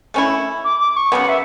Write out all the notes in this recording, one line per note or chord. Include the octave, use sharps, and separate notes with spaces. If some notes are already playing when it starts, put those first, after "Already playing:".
A3 C#4 E4
D6
D6
C#6
C#3 F#3 B3 F#5
E5